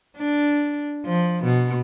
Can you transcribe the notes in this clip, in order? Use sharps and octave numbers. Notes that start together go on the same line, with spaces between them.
D4
F3
B2